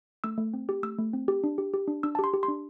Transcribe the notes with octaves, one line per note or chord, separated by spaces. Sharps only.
A3 E6
A3
C4
G4
A3 E6
A3
C4
G4
D4
G4
G4
D4
D4 E6
A5
G4 C6
G4
C6
D4